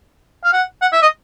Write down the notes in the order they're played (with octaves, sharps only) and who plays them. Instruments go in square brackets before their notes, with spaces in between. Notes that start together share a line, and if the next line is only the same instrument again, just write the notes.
[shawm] F5
F#5
F#5
E5
D#5